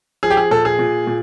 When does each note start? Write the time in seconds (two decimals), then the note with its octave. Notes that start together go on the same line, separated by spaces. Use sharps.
0.23 F3 G#4
0.30 G4
0.37 G#4
0.51 A#2 A4
0.65 G#4
0.79 A#2
1.07 A#2